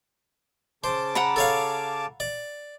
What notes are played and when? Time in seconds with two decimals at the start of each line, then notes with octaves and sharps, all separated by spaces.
0.84 C#3 C5 A5 D6
1.15 F#5 A#5 B5
1.36 A4 C#5 F5
2.20 D5